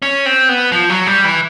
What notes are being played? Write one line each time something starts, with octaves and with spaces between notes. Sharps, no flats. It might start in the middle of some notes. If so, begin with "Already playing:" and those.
C#4
C4
B3
F3
F#3
G3
E3